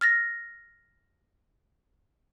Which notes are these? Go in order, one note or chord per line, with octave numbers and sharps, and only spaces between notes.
F6 A6 A#6